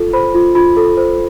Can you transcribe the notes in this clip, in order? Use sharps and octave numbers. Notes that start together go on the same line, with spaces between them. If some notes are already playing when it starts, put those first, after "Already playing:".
Already playing: F4 A4
C5 B5
F4
F4 B5
A4
C5